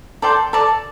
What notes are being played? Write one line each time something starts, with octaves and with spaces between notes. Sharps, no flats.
A4 D5 G5 C6
A4 D5 A5